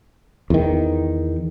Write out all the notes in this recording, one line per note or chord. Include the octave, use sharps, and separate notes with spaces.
E2 D#3